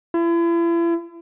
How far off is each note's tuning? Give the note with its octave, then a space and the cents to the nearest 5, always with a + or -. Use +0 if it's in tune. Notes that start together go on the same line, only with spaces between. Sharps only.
E4 +40